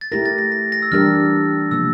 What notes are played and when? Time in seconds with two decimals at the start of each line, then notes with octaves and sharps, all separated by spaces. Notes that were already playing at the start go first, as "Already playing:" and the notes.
0.01 A6
0.12 A3 E4 G4 A#4 A#6
0.25 A6
0.38 A#6
0.52 A#6
0.72 A#6
0.82 E6
0.92 E3 G3 D4 G4 A#4 F6
1.71 C3 F3 A#3 E6